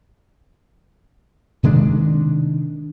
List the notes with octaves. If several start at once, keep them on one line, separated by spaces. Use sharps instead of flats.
C3 D#3 G#3 D4